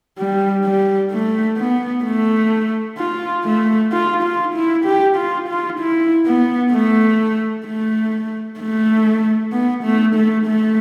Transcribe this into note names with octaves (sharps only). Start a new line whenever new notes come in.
G3
G3
A3
B3
A3
F4
A3
F4
F4
E4
G4
F4
F4
E4
B3
A3
A3
A3
B3
A3
A3
A3